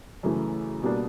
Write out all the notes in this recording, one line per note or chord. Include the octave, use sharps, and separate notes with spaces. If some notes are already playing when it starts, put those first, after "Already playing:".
F#2 C#3 E3 A3
B2 G3 A#3 D4